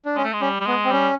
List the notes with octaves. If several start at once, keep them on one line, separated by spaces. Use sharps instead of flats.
D4
G#3 C#4
A3
G#3
G3 C#4
G3
G#3 B3
C4
G3 C#4